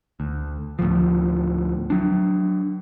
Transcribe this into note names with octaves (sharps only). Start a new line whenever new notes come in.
D2
D2 A2 F3
F#3 D4